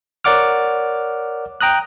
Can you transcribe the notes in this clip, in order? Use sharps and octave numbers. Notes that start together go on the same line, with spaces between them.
A#4 C#5 D5 F#5 D6 F6
G5 A#5 D#6 F#6